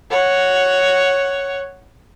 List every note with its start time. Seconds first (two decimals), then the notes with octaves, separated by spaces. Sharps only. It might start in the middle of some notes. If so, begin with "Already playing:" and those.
0.11 C#5 F#5